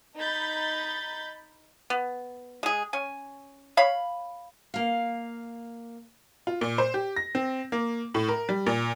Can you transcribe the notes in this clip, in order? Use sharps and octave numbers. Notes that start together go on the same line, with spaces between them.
D#4 B5 G6 A6
B3
G#3 G#4
C#4 G#5
C#5 F5 B5
A#3 F5
F4
A#2
C5
G4
A#6
C4
A#3
A2
A#4
G3
A#2